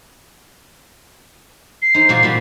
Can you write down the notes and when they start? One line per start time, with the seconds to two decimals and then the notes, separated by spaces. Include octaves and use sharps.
1.82 C7
1.94 D#4 C5
2.09 A#2 A#3 F#4
2.23 A#2 G3 C4